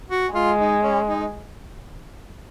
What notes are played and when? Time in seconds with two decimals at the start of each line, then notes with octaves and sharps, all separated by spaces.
0.10 F#4
0.34 G#3 F4
0.59 D#4
0.83 C#4
1.08 D#4